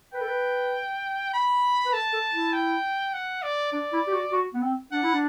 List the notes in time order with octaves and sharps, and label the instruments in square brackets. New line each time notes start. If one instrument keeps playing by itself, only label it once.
[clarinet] B4 [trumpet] G5
[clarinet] A4
B4
[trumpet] B5
[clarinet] B4
[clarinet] A4 [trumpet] A5
[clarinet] A4
E4
[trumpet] G5
F#5
D5
[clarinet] D4 [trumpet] D5
[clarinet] E4
G4
F#4
F#4
B3
C4
[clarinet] D4 [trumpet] F#5
[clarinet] E4
D4